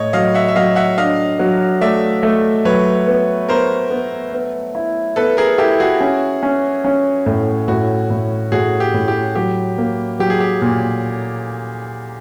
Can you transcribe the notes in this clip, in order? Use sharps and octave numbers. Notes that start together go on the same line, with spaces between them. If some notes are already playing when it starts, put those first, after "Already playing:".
Already playing: A2 A3 C#5 D#5
F#3 D#5 F5
E5 F#5
E5
F#3 D#5 F5
E5 F#5
D4 D#5 F5
F#3
A3 D5 E5
A3
F#3 B4 C#5
B3
B3 A#4 C5
B3
B3
E4
B3 A4 B4
G#4 A#4
E4 G4 A4
F#4 G#4
C#4
C#4
C#4
A2
A2 F#4
A2
A2 F#4 G#4
G4
A2
G4
F#3 G4
A#3
F#3 G4
G#4
G4
A#2